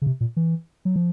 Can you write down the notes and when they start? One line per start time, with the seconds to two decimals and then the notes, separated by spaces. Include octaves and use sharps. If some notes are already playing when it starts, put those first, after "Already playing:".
0.02 C#3
0.06 C3
0.21 A#2
0.37 E3
0.85 F#3
0.96 F3